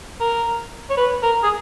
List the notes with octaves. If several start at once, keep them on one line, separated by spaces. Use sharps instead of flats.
A#4
C#5
B4
A#4
G#4